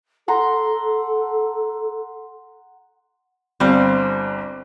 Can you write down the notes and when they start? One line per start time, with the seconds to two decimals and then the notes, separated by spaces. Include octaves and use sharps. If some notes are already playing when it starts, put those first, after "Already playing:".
0.28 A4 F#5 A#5 C6
3.60 G1 G3 C4 F5